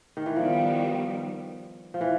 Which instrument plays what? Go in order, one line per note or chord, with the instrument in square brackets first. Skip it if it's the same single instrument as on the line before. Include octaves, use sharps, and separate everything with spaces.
[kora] D#3
E3
[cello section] D#3 G3 B3 [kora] F3
[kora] F3
E3